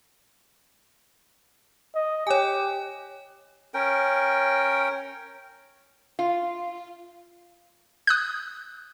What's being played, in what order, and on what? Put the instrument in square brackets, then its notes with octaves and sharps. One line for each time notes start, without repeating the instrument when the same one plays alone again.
[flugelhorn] D#5
[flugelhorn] G4 [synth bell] C#5 G#5
[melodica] C#4 A#4 G5
[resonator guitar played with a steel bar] F4
[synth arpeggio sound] D#6 F#6 G6